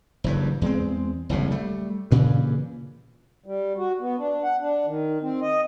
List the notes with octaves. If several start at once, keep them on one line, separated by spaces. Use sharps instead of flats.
F#1 G2 E3
E2 G#3 C4
F#1 C2 A2 D#3
G3 A3
G2 A#2 C#3 E3
G3
F#4
B3
D4
F#5
D4
D#3
C4
D#5